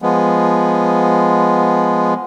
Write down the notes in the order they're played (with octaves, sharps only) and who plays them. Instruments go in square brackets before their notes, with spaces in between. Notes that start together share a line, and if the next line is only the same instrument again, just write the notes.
[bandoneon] F3 G#3 B3